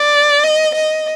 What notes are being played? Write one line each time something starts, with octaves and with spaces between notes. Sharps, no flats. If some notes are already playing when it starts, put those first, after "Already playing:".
Already playing: D5
D#5
D#5